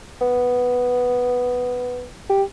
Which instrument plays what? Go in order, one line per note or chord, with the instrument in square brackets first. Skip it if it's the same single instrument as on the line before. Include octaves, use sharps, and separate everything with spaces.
[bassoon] B3
G4